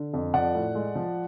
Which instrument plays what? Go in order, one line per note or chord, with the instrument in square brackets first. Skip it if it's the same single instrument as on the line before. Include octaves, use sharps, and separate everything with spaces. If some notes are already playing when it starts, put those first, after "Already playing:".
Already playing: [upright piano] D3
F2
F3 D5 F#5
A2
G#3
F3